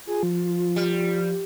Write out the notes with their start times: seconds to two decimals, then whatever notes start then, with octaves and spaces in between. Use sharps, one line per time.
0.07 F4 G#4
0.23 F3
0.76 G3